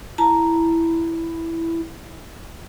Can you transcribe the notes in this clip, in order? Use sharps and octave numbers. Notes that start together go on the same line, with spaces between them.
E4 A5 A#5